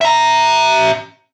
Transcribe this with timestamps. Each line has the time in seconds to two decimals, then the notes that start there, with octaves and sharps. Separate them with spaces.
0.01 E5 A#5